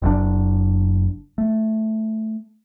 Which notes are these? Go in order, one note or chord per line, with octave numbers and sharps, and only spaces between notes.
F#1 F#2 C#3 D4
A3